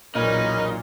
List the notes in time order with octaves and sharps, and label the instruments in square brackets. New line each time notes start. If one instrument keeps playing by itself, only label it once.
[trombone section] B1 E2 A#3 [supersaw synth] A#2 [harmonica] C#4 A#4 B4 [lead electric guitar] D#4